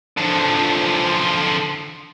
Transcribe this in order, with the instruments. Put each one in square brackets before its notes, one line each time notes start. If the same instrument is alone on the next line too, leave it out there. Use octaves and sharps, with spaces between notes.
[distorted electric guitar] D3 F3